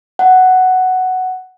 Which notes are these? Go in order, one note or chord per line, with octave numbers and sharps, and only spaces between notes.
F#5